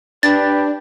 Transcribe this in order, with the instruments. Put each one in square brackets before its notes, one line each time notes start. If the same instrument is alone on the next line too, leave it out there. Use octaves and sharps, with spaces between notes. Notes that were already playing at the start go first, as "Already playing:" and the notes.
[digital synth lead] D4 [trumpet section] G4 B4 [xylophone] A6